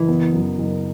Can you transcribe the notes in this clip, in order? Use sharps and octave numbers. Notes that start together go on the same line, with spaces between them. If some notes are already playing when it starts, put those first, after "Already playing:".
Already playing: F#1 E3
B3
F#2
F#1